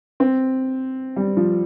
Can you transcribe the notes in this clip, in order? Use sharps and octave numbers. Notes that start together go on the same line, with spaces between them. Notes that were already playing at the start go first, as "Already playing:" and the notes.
C4
G3
F3